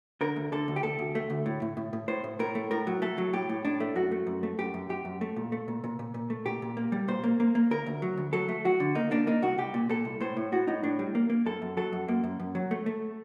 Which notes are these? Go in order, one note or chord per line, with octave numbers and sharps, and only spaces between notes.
D3 A#4
D2
D3 A4
D2
G4
D2 A4
D2
A3
D2
A2
A2
A2
A2
A2 C5
A2
A2 A#4
A3
A2 A#4
F#3
A3 A4
F#3
A2 G4
A2
A2 D4
A3
F#2 F#4
A3
F#2
A3
F#2 G4
F#2
F#2 G4
F#2
A3
A#2
A3
A#2
A#2
A#2
A#2
A3
A#2 G4
A#2
A#3
G3
A#2 C5
A#3
A#3
A#3
D2 A#4
D2
F#3
D2
F#3 A4
A3
F#3 F#4
D3
A#3 D#4
A#3 D4
A#3 D#4
C2 F#4
C2 G4
A#2
A#2 A4
C2
A2 C5
A2
A2 F#4
A2 D#4
A2 D4
G3
A#3
A#3
F#2 A4
F#2
F#3 A4
F#2
F#2 A#3
F#2
F#2
F#3
A3
A3